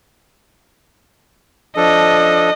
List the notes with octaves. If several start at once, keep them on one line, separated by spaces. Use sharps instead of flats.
F3 D4 A4 D#5